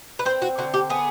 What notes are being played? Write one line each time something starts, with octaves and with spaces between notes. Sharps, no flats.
B4
C4 C5
F#4
D3 F#4
G4
B3 G#4